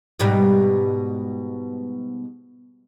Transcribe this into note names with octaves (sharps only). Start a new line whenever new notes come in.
G#2 B2 G3